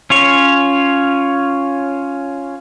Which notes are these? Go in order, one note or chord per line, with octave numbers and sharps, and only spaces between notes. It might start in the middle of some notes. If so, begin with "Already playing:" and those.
C#4 F4 C#5